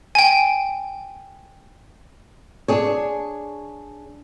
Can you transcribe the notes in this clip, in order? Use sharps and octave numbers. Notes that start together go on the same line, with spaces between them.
G5 G#5
D4 G#4 C#5